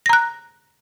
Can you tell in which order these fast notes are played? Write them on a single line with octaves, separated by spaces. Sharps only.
A#6 A#5 F#6